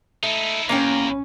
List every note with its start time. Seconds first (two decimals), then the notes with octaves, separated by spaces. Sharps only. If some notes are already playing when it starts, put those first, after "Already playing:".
0.23 A3 D#4 E4
0.69 E2 A#3 C#4 A#4 G5